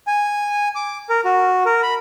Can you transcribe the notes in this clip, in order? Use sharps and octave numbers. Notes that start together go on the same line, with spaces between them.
G#5
D6
A#4
F#4
A#4
B5